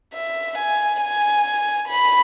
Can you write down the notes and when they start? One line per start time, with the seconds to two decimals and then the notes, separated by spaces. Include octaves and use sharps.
0.14 E5
0.57 G#5
1.01 G#5
1.88 B5